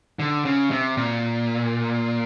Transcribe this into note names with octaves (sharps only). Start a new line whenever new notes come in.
D3
C#3
C3
A#2